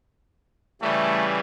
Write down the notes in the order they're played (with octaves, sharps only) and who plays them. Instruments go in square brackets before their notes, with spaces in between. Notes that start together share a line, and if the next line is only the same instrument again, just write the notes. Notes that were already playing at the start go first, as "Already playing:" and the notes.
[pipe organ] C#3 E3 G3 [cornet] A3